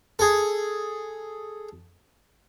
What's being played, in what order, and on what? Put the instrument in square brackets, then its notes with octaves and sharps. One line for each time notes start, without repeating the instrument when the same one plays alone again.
[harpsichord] G#4 A4